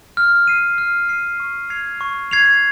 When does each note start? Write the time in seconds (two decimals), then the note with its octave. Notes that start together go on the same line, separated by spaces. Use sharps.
0.17 F6
0.47 C7 D#7
0.78 F6
1.09 C7 D#7
1.40 C#6
1.70 G#6 C7 F7
2.01 C#6
2.31 G#6 C7 F7